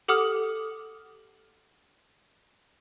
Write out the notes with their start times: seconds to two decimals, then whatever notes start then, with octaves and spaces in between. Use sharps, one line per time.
0.08 G4 A4 F#5 D6 D#6 F6